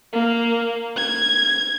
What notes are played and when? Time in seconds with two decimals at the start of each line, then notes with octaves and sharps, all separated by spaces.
0.13 A#3
0.97 G#6